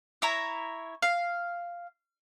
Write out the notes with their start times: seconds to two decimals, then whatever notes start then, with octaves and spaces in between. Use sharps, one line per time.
0.22 E4 C#5 A#5
1.02 F5